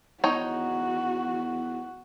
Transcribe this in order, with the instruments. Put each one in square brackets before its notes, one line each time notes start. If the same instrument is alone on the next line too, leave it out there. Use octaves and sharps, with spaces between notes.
[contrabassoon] E2 [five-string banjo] D#4 C#5 G5 [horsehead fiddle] F#4